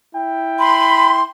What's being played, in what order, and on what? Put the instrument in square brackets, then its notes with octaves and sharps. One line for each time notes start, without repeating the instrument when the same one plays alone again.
[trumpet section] E4 G5
[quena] B5 [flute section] C6